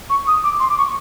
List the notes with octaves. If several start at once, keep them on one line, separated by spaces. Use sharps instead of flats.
C#6
D#6
D6
C6
D6
C#6